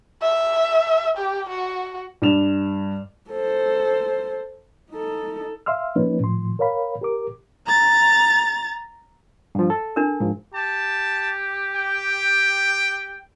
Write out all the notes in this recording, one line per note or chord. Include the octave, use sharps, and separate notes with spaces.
E5
G4
F#4
G2 G3 E7 F7
A4 C5
D#4 A4
E5 F5 C6 E6 F6
F3 A#3 C#4 D#4 B4
A2 D#3 F3 C6
A#4 C#5 F5 B5
G4 A#4 D6
A#5 A6
G2 F3
A4
D4 A#4
G#2 F3
G4 A5
G5